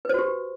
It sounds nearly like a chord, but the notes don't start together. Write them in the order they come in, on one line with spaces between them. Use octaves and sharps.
B4 C5 F#4 G4